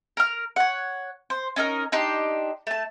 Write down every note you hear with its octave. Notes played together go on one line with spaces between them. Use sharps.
A#4 F6
C#5 F#5
C5
C#4 D#4 A4 A#4
D4 D#4 G4 C6
A3 A5